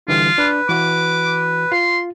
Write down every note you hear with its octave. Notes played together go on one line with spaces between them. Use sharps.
D3 E3 G3 F4
D4 B4
E3 F#4 D6
F4 C6